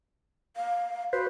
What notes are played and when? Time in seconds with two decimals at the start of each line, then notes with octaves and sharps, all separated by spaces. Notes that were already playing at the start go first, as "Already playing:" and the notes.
0.56 F5
1.13 F#4 B4 C5